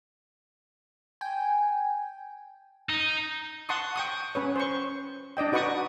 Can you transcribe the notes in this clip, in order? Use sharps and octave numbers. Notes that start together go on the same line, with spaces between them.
G5 G#5
D#4
F#5 A5 C6 C#6 D#6
G5 C#6 D#6
C#4 B4 C#5
C5 C#6
D4 D5 D#5 G5
D#4 F#4 B4 D5 C#6 D#6